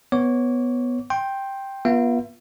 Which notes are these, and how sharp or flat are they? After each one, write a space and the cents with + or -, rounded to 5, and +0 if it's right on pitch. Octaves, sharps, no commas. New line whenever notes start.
B3 +0 C#5 -15 D6 -30
G5 +0 C6 +20
B3 -35 F4 +0 E5 +35